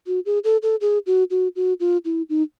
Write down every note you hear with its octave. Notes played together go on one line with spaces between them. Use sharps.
F#4
G#4
A4
A4
G#4
F#4
F#4
F#4
F4
E4
D#4